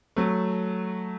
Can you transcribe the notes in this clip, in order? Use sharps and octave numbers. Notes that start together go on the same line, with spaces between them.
F#3 A3